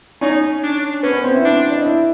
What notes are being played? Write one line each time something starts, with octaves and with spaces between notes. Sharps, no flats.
C#4 D#4 C#5
D4
B3 C#4 B4
B3 B4
C4 C5
E4 E5
D4
D5
D#5
E4 E5